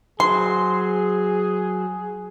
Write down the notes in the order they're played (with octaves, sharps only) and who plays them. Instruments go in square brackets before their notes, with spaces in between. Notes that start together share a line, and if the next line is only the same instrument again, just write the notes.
[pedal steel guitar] F#3 C5 [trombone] G#4 [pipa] C6